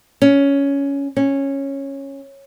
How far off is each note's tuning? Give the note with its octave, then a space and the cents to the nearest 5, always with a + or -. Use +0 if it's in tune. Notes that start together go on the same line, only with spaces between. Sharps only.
C#4 +10
C#4 -10